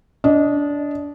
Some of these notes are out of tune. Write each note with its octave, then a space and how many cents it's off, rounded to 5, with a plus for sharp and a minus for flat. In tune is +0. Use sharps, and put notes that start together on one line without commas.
D4 -20 D#5 +0